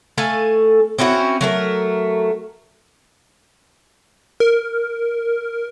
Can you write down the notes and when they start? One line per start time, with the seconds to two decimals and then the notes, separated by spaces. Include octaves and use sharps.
0.18 A3 A4 F5 G#5
0.98 C4 C#4 E4 F#4
1.41 F#3 A3 A#4
4.40 A#4